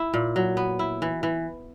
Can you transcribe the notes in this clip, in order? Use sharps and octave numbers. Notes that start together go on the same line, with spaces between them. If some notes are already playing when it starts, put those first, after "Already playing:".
Already playing: E4
A#2
F#3
B3
E4
E3
E3